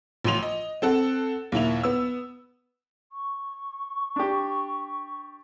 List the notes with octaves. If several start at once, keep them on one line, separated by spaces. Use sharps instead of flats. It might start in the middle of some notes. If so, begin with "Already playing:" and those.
A1 F3 C6 D#7 F7
D#5
C4 A4 F#5
D#2 A#2 E4 F7
B3 E6
C#6
D4 G4